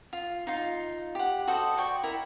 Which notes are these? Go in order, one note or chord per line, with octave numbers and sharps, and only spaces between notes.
F4
D#4 F4
G4 F#5
F#4 A4 C5 D#5
D5 G5 C#6
E4 A#4